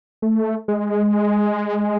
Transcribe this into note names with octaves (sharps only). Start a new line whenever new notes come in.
A3
G#3